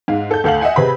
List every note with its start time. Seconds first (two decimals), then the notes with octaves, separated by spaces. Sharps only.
0.08 G#2 F5
0.31 A4 G6
0.44 D2 A4 F5 F#5 F#7
0.61 D#5 E5 F#5 G#5
0.76 C3 G#4 B4 C5 B5